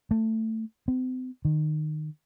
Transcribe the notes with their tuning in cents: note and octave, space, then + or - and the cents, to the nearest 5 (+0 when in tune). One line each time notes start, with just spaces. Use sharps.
A3 +15
C4 -40
D#3 -25